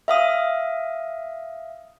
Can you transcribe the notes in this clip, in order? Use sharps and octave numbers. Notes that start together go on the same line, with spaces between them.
E5 F5 D#6